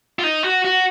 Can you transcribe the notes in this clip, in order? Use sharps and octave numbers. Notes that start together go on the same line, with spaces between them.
F4
D#4
F#4
F#4